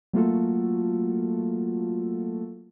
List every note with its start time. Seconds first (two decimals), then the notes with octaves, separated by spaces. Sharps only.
0.13 F#3 A3 A#3 F4 F#4 A4